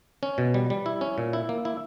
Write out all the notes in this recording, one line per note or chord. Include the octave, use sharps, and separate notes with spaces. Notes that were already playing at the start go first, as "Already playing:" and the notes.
C#4
B2
G3
G3
E4
C#4
A#2
E4
A#3
E4